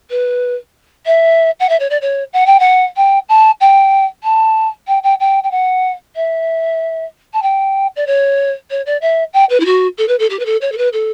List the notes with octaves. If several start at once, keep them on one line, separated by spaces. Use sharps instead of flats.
B4
E5
F#5
E5
C#5
D5
C#5
F#5
G5
F#5
G5
A5
G5
A5
G5
G5
G5
G5
F#5
E5
A5
G5
D5
C#5
C#5
D5
E5
G5
B4
E4
F#4
A4
B4
A4
G4
B4
A4
C#5
A4
B4
A4